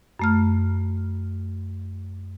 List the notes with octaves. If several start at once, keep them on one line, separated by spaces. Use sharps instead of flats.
F#2 A3 F6